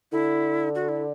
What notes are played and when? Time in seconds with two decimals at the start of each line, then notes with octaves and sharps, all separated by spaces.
0.12 D3 E4
0.75 F#4
0.89 E4